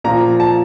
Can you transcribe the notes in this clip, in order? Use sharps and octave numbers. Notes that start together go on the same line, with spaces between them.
A#2 F3 A#5
A5